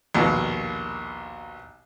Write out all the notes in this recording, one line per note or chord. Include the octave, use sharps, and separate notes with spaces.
A#1 D#2 B2